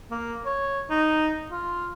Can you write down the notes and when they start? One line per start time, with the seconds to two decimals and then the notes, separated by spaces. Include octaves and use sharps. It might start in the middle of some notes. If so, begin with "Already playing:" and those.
0.11 A#3
0.46 C#5
0.90 D#4
1.51 F4